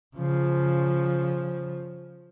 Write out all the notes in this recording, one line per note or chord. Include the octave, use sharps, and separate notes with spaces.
C#3 F3